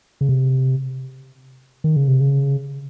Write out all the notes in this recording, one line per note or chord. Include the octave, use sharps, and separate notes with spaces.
C#3
C3
D#3
C#3
C3
C#3